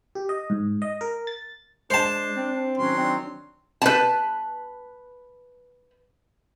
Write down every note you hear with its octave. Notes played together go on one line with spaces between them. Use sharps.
G4
D#5
G#2
D#5
A#4
A6
G#3 D4 C5 A5
C4
D#3 F#3 C#4 C6
C4 D4
B4 A5